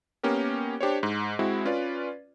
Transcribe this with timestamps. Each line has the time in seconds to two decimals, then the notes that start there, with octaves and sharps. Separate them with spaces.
0.23 A#3 B3 C#4 G4 A#4
0.81 D4 G4 C5 C#5
1.03 G#2
1.39 G#3 C4 E4 F#4
1.65 C#4 F4 B4 D5